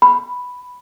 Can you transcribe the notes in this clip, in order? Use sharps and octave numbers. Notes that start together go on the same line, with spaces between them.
B5